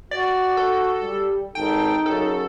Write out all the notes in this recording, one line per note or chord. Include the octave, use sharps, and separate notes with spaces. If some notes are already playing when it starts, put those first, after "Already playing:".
F#4 D5
A4
G3
G#1 D#4 A4 G5
F#2 C#3 A4